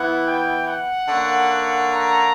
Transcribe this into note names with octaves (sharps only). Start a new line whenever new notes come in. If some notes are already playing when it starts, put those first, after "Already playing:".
Already playing: E3 B3 E4 F#5
G5
F#5
D3 A#3 C#4
A#5